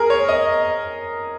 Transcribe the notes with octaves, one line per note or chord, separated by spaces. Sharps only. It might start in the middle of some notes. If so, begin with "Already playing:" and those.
Already playing: G#4 A#4
C#5
D#5